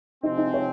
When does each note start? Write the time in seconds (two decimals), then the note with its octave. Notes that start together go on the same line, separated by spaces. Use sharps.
0.23 C3 F3 G#3 C4 D#4
0.38 D#4
0.54 C#5